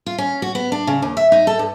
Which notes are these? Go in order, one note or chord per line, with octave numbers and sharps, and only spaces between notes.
F4
C#4
F#4
B3
D4
C#3
D#2
E5
D#4
A4
G2